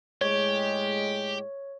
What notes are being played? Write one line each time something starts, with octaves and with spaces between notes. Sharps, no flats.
A2 G#3 G4 C#5